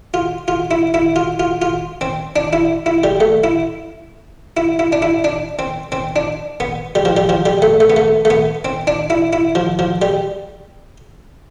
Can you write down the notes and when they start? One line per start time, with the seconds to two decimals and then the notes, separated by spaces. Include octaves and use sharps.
0.14 F4
0.48 F4
0.71 E4
0.94 E4
1.16 F4
1.39 F4
1.62 F4
2.01 C4
2.36 D4
2.53 E4
2.86 E4
3.04 G3
3.20 A3
3.44 E4
4.57 E4
4.79 E4
4.92 D4
5.02 E4
5.24 D4
5.59 C4
5.92 C4
6.16 D4
6.60 B3
6.95 G3
7.05 F3
7.17 G3
7.29 F3
7.46 G3
7.62 A3
7.80 A3
7.90 B3
7.96 A3
8.25 A3
8.30 B3
8.65 C4
8.87 D4
9.10 E4
9.33 E4
9.55 F3
9.79 F3
10.02 G3